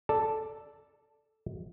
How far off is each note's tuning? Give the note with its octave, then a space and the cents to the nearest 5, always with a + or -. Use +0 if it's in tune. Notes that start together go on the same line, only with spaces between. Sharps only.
A4 +0 D5 +0 A5 +0